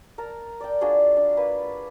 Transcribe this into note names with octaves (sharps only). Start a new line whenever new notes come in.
A#4 A5
D5 G5
D4 F4 F#4 G#4
D4
A#3 B4